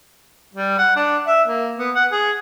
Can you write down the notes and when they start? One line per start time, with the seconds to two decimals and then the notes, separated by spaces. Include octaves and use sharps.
0.54 G3
0.78 F#5
0.96 D4
1.26 E5
1.47 A#3
1.78 B3
1.94 F#5
2.12 G#4